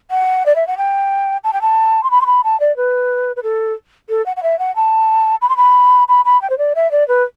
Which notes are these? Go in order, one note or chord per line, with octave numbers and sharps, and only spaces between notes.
F#5
D5
E5
F#5
G5
A5
G5
A5
C6
B5
C6
B5
A5
D5
B4
B4
A4
A4
F#5
F#5
E5
F#5
A5
B5
C6
B5
B5
B5
G5
C5
D5
E5
D5
B4